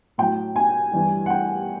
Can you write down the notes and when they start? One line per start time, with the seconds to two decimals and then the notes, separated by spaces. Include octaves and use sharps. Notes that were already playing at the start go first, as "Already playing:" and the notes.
0.18 A2 F#3 G5
0.56 G#5
0.93 G2 E3 G3
1.26 F#5
1.30 G5